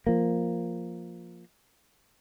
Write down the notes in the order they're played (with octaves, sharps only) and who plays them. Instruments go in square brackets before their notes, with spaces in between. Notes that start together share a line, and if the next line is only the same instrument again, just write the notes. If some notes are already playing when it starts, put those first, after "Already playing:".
[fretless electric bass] F3 A#3